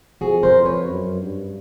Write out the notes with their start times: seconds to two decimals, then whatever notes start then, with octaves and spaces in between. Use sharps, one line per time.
0.21 F2 F#4 G#4
0.43 A#4 C5
0.54 F2
0.65 B4 C#5
0.88 F#2
1.21 G2